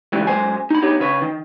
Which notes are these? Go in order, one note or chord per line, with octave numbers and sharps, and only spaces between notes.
G#2 C#3 E3 G3
F#2 G#3 C5 G#5
D#4 B5
B3 D#4 G4 C#5
C#3 B4 C#5
D#3